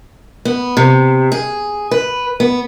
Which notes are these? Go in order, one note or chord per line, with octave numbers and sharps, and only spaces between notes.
B3
C3
G#4
B4
B3